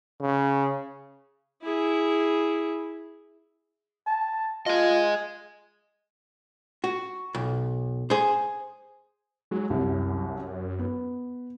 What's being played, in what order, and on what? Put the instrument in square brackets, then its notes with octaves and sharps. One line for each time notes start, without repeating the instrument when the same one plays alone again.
[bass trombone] C#3
[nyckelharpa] E4 G#4
[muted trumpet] A5
[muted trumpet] F4 [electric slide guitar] G#4 D#5
[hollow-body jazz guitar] F#4
B1
G#4 C5
[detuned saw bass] F#3 [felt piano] G#3
[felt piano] C2 [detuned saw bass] F#2
[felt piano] B3